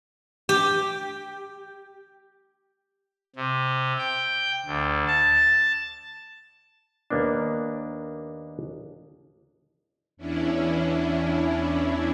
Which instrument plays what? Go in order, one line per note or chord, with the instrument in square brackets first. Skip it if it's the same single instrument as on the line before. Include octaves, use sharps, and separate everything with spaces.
[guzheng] G4
[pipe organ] C3
G5
D2
A5
[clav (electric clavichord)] D#2 A#3 B3 D4
[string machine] E2 C#4 D4 E4